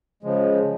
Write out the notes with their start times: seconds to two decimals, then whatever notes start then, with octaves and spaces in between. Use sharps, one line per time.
0.23 C#3 F3 G#3